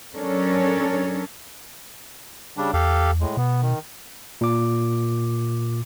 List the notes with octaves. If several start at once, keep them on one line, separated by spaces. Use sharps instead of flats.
F#3 C#4 D4 A4 A#4 C#5
C#3 G3 D4
E2 G4 A4 F5
A2 G#3
B2 B3
D#3
A#2 D6